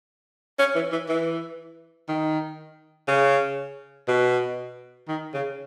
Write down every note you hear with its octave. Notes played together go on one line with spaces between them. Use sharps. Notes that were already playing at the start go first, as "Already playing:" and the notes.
C#4
E3
E3
E3
D#3
C#3
B2
D#3
C#3